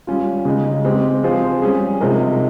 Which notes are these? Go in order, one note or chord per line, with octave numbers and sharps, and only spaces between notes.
G3 C#4 F4
C#3 G#3 D#4
G#3 C4 G4
F3 C4 F4 G#4 C5
G3 C#4 G#4
C3 F3 G#3 D#4 A#4